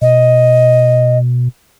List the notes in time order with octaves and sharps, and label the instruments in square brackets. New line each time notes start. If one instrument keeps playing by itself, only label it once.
[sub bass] B2 [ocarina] D#5